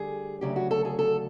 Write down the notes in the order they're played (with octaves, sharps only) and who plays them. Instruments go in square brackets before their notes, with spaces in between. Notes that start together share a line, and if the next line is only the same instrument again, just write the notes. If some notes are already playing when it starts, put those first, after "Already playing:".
Already playing: [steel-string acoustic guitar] D2 D3 G3 G#4
D2 C#3 F#3 G4
F#4
A4
G#4
A4